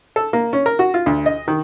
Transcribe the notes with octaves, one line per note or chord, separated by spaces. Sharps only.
A4
A#3
C#4
A#4
F#4
F4
D2
D#5
D#3